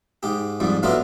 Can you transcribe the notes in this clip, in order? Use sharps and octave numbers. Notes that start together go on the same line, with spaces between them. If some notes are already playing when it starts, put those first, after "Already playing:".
G#2 G4
F2 G#2 G3
A2 F#3 A3 B3 D4 F4